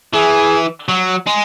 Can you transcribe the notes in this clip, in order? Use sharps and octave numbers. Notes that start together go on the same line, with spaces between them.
E3 G#4
F#3
G#3